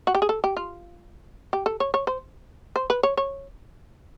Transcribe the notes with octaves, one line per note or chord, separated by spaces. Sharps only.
F#4
G4
G#4
A4
G4
F4
G4
A4
C#5
C#5
C5
C5
B4
C#5
C#5